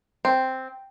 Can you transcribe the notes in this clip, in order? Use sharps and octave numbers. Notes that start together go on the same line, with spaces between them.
C4